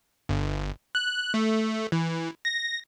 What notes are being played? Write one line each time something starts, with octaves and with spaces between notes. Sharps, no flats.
G1
F#6
A3
E3
A#6